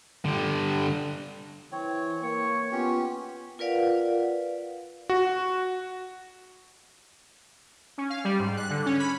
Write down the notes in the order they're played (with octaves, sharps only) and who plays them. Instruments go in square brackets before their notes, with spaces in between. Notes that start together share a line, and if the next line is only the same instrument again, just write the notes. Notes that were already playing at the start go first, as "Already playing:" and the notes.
[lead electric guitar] D3 G3
[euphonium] E3 [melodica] C4 C#5
[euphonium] A#3 [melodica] C#5 [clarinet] C#6
[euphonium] B3 [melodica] C#4 G4 [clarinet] F4
[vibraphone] F4 A#4 B4 D5 F5 F#5
[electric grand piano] F#4
[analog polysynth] C#4
F5
G3
G#2
F#6
D3
C#4
B5